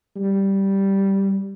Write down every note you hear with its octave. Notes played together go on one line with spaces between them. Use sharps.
G3